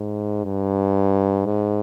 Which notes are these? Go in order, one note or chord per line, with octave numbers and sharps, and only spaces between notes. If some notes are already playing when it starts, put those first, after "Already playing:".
Already playing: G#2
G2
G#2